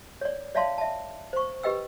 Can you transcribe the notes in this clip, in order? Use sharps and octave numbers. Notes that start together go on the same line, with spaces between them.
C#5 D5
C#5 D5 E5 F5 A5 C6
E5 A5
C5 C#6
G4 B4 D#5 G5 E6